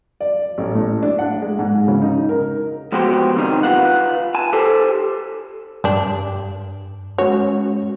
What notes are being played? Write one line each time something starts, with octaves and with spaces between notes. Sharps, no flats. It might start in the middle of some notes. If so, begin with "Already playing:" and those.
D5
A1
A2
D4
F#5
G#3
G#2
C#3
D#4
A#4
F3 G#3 B3 F#4 G4 C5
C3 D#3 G3 D4 D#4
F4 B4 F5 F#5
G#5 A5
G4 A4 C5 A5
G2 G3 D4
G#3 C#4 F#4 C#5